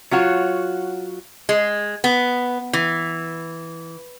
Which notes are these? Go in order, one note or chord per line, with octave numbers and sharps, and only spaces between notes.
F#3 F4 F#4 C#5
G#3
B3
E3